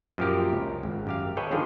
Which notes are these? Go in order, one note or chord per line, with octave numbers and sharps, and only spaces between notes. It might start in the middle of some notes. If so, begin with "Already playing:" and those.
F#2 A#2 F3 F#4 G4 A#4
C#2
G#1
F#2 G4 F5
G#4 A4 B4 C#5 D#5 G5
D3 D#3 F3 D4 F4 G#4